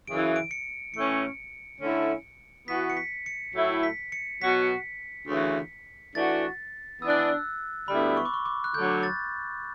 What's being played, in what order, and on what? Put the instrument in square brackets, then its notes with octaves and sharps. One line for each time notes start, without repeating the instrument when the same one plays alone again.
[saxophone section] F#2 C#3 E3 [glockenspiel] D7
[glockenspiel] D7
C#7
[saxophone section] A2 E3 A3 C#4 [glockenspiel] C#7
[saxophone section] D3 A3 C#4 E4
[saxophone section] E3 B3 F#4 [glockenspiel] B6
[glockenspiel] C#7
B6
C#7
[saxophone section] A2 F#3 A3 E4
[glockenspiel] B6
C#7
[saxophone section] B2 F#3 B3 F#4 [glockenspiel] B6
[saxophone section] D2 C#3 E3
[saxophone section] E3 A3 D4 F#4 [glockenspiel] A6
[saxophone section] E3 B3 D4 [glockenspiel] E6
[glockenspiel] F#6
E6
[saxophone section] D2 D3 G3 B3 E4 [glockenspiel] B5
[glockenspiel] C#6
D6
C#6
D6
F#6
[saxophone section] D2 D3 F#3 [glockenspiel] G6
[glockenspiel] A6